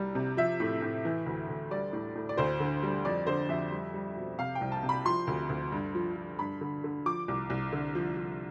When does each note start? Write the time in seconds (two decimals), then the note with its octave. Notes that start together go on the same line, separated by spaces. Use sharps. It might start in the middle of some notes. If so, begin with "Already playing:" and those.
Already playing: C2 G3
0.15 C3
0.37 F3 E5
0.60 A2
0.82 A2
1.05 E3
1.26 D2
1.49 D2
1.71 G3 D5
1.93 A2
2.15 A2
2.29 D5
2.37 D2 C5
2.60 D3
2.83 G3
3.05 F2 D5
3.27 D3 C5
3.49 F2 E5
3.71 G3
3.94 G3
4.16 B2
4.38 C3 F5
4.55 G5
4.61 C2
4.72 A5
4.83 C3
4.89 B5
5.06 F3 C6
5.27 D2
5.49 D2
5.72 G2
5.95 F3
6.16 F3
6.39 G2 B5
6.61 D3
6.84 D3
7.06 F3 D6
7.28 C2
7.50 C2
7.72 D3
7.95 F3
8.17 F3